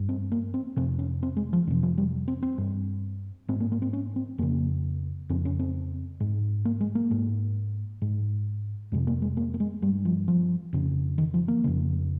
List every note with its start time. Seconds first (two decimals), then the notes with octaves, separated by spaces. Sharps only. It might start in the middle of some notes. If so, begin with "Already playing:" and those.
Already playing: G2
0.09 C4
0.32 A#3
0.54 C4
0.76 F2 C3 C4
0.99 C#4
1.23 C4
1.37 G#3
1.53 F3
1.67 F2 D#3
1.70 C3
1.83 F3
1.98 G3
2.28 C4
2.43 C4
2.58 G2
3.48 G#2 C4
3.60 A#3
3.72 A#3
3.82 C4
3.93 C#4
4.16 C4
4.38 F2 C#3 A#3
5.29 F2 C#3 C4
5.45 C#4
5.59 C4
6.20 G#2
6.65 A#3
6.80 G#3
6.95 A#3
7.11 G#2
8.02 G#2
8.92 F2 C3 G#3
9.07 A#3
9.22 G#3
9.37 A#3
9.54 A#3
9.60 G#3
9.82 G2 G3
10.05 F3
10.28 F3
10.73 F2 C#3
11.18 D#3
11.34 F3
11.48 A#3
11.64 F2 C#3